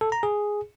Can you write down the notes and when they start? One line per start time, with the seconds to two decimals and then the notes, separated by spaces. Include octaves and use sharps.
0.01 A4
0.12 A#5
0.23 G#4